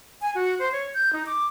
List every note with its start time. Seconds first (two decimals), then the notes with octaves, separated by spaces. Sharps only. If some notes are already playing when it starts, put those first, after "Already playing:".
0.21 G#5
0.35 F#4
0.59 C5
0.72 C#5
0.94 G6
1.13 D#4
1.26 D6